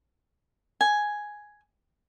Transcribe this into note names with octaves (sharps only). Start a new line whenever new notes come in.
G#5